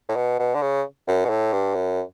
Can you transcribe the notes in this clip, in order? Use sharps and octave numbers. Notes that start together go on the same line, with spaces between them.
A2
B2
B2
D3
C#3
F#2
B2
A2
G2
F#2